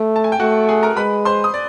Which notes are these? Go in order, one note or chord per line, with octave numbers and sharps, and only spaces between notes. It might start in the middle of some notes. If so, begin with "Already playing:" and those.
Already playing: A3
A5
G#5
G5
A3 F#4 F#5
G#4 G#5
A#4 A#5
G#3 B4 B5
C5 C6
D#6
D5